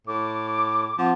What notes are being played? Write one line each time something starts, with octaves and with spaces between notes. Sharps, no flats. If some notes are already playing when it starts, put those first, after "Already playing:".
A2 D6
F3 C4 F#5 A5